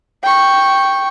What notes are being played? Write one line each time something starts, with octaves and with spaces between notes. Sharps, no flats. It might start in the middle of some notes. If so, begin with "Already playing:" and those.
G5 C#6